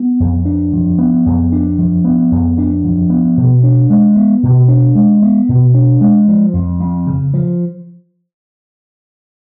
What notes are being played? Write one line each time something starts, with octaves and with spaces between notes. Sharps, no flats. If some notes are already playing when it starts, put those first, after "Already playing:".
Already playing: B3
F2
D4
F3
B3
F2
D4
F3
B3
F2
D4
F3
B3
B2
D4
G#3
B3
B2
D4
G#3
B3
B2
D4
G#3
F3
F2
F2
C#3
F3